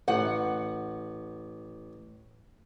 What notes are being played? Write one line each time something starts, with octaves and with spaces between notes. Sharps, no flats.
A1 F#5